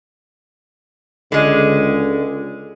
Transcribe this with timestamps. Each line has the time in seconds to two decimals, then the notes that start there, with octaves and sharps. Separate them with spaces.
1.32 C#2 D3 G#3